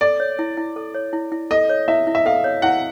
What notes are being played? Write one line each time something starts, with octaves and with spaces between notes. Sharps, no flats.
A4 D5
C#5
E4
E4
A4
C#5
E4
E4
A4 D#5
C#5
E4 E5
E4
E5
A4 F5
C#5
E4 F#5